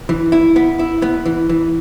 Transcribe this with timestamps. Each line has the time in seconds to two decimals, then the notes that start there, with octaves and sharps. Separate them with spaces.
0.09 E3
0.32 E4
0.56 B3
0.79 E4
1.02 B3
1.26 E3
1.49 E3